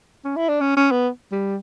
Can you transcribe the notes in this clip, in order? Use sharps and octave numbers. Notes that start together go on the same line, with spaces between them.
C#4
E4
D4
C#4
C#4
B3
G3